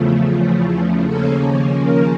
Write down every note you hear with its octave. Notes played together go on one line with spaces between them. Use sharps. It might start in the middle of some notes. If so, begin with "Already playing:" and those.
Already playing: E2 C#3 F3 A3
D#2 C#3 F3 A#3 C#4 A4
A#4